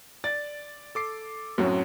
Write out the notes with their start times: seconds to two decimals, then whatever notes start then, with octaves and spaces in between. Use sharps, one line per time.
0.24 D5 A6
0.95 A4 D6 C7
1.58 F#2 A2 F#3 C4 C#4